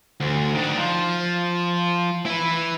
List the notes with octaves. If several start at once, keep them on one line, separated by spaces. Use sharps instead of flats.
D2
D#3 D4
F3
E4 B4